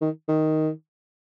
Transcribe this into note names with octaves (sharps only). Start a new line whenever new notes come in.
D#3
D#3